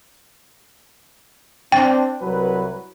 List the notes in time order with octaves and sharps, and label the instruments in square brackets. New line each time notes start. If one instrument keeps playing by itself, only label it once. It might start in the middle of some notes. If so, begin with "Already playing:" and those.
[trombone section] C4 D4 [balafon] G5
[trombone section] C2 F#3 B4